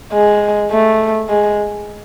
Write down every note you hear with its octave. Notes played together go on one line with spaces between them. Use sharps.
G#3
A3
G#3